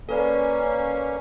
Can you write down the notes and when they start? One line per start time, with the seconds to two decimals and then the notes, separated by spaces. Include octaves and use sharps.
0.09 A#3 C#4 A4 B4 D5